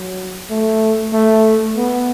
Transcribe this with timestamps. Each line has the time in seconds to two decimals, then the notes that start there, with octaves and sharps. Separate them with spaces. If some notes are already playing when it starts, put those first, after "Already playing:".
Already playing: F#3
0.50 A3
1.13 A3
1.76 B3